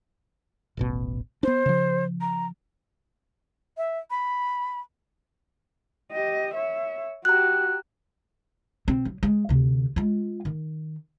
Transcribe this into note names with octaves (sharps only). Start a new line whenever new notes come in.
D#1 A1 B2
B3 D4 C5
C#3 F3
A#5
E5
B5
G4 D#5
C#5 E5
F#4 G4 A#5 F#6
B2 C4
F#3
G#3
D2 C3
G#3 F4
D#3